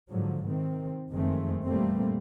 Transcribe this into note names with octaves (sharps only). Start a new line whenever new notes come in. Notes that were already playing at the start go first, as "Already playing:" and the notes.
G#2 D3 F3 F#3
C3 D#3 C4
F#1 F2 D#3 G#3 A3 C4
A#2 E3 G3 A3 A#3 C4